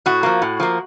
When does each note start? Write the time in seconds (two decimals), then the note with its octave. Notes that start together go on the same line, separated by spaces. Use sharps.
0.06 A2 F#4
0.23 F3 A#3
0.42 A2
0.60 F3 A#3